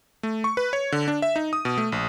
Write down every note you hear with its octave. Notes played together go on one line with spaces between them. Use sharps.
A3
C#6
B4
C#5
D3
D4
E5
D#4
D#6
B2
A3
A#1